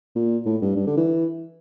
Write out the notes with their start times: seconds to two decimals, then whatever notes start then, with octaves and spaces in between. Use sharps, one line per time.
0.16 A#2
0.46 A2
0.61 G2
0.76 G2
0.87 D3
0.97 E3